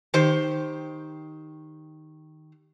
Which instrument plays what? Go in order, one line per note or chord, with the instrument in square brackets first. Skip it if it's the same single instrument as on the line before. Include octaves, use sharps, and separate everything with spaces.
[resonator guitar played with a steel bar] D#3 G4 C5